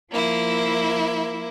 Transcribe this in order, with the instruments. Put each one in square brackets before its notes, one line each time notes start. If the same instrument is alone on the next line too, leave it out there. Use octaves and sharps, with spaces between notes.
[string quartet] F3 A#3 E4